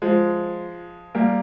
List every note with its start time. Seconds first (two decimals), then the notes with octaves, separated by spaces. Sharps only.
0.02 F3 G#3
1.15 G3 A#3